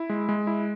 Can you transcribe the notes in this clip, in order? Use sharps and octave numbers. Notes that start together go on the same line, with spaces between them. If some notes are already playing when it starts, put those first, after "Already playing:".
Already playing: E4
G#3
G#3
E4